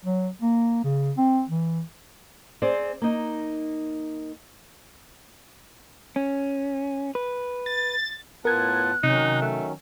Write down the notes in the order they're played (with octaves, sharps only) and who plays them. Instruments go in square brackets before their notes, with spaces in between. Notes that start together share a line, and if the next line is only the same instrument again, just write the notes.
[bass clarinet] F#3
A#3
C#3
C4
E3
[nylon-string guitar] C4 G#4 C5 D5
A#3 D#4
[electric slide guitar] C#4
B4
[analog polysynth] A6
[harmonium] A2 F4 A5 [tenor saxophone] B3 [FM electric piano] A#4 G#6 [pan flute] F#6
[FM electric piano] C3 [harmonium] D#3 F#3 C#4 [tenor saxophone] D#4
[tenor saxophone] A3